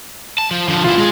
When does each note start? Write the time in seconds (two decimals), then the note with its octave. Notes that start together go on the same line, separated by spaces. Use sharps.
0.38 A5
0.51 F3
0.68 D3 F3
0.84 B1 E4 F4
0.98 G#3 G#4